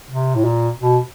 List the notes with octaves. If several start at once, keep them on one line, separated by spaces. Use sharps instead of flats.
C3
A2
A#2
B2